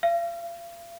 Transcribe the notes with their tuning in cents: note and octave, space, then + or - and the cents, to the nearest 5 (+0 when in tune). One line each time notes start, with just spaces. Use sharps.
F5 -40